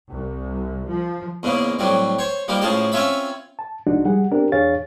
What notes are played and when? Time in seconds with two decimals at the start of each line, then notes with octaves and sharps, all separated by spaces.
0.10 C2
0.88 F3
1.43 E2 G#2 C#3 A#3
1.79 A2 F#3 G3 C4
2.19 C5 C#5
2.48 F3 G3 A#3 D#4
2.61 A2 C#3 F3 G#3 F5 A5
2.92 C4 C#4 F4 C#5 E5 B5
3.59 A5
3.87 C2 F3 G#3 D4 D#4 F#4
4.05 G3 G#4 F#5
4.31 B3 C4 D4 G4 A#4
4.52 E2 D4 G#4 C#5 F5 A6